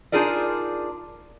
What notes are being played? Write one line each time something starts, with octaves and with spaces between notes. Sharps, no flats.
D4 D#4 F4 G#4 A#4 D5